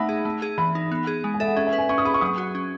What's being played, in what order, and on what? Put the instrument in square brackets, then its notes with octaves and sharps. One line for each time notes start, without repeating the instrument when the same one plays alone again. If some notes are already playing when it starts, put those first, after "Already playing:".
Already playing: [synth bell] A3 D#4 [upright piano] E5 F#5 B5
[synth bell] G#4
A3
G#4
[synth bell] E3 [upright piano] B5
[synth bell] D#4
B3
G#4
G#3
[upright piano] G#5
[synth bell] A4 [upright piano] E5
[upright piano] F#5
[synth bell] C#4 [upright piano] E5
[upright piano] E5
[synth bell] B4
[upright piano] G#5
[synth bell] C#4 [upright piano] C#6
[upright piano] D#6
[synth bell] G#4 [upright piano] B5
[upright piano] C#6
[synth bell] F#3 [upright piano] D#6
[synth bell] F#4
C#4